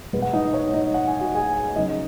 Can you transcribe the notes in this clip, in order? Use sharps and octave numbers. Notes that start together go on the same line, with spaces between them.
B2 G#3 B3
F#5
D#4 D#5
C#5
D#4 D#5
F#5
G#5
F#4 F#5
G#4 G#5
C#3 F#3 B3 D#4 D#5